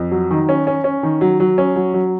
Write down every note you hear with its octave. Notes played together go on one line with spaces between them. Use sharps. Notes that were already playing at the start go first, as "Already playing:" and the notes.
Already playing: F2
F#3
D#3
C#4
C#4
C#4
D#3
F#3
F#3
C#4
F#3
F#3